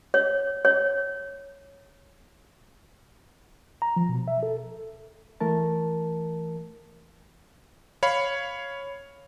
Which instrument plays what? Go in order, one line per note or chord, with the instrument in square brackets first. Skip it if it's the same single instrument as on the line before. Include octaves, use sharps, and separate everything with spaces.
[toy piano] C#5
C#5
[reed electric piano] A#5
F3
B2
E5
A4
E3 A3 A#4 A5
[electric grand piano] C#5 F5 B5